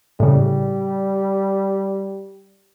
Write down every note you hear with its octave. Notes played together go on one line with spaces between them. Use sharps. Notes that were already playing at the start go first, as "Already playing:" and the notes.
A2 C#3 G3